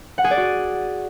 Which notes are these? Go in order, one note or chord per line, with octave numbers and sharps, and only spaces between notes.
F#5
G#4
D5
F#4